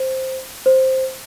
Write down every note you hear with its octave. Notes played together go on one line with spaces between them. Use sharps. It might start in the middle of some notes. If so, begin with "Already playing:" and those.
Already playing: C5
C5